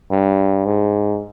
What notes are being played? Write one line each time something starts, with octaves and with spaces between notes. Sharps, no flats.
G2
G#2